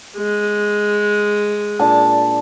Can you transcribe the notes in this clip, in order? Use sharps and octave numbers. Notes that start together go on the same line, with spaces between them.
G#3
A#2 D4 A5